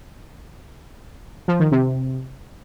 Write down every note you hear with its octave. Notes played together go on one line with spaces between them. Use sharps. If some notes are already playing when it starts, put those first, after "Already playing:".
F3
D#3
C3